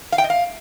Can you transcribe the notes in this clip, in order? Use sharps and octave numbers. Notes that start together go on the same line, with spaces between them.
F5
G5
D#5
F5